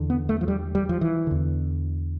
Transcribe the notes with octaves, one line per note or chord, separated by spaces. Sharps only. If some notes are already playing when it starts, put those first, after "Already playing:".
Already playing: E2 D3
B3
A3
F3
G3
G3
F3
E3
E2 D3